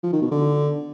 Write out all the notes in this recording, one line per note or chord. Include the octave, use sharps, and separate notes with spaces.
F3
D#3
B2
D3